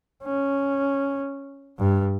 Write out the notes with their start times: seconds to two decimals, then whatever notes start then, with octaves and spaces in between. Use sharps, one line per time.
0.23 C#4
1.79 G2